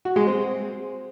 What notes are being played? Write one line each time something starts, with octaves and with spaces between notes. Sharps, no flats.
F#4
G#3
C4